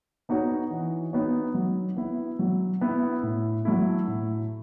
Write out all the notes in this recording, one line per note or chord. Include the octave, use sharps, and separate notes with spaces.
B3 D#4 F#4 C#5
E3
B3 D#4 F#4 C#5
F#3
B3 E4
F#3
B3 E4
A2
F#3 A3 E4
A2